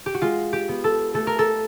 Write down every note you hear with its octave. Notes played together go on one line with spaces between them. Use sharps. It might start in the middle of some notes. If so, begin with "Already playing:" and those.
G4
F#4
G#3 F4
G4
B3
A4
A3 A4
A#4
A4